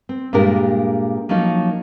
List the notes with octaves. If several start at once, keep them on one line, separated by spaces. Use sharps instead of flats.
C4
G2 A#2 G#3 G4 A#4
F3 F#3 A#3 C#4 D#4